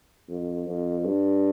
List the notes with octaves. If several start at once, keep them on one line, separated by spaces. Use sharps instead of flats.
F2
F2
G2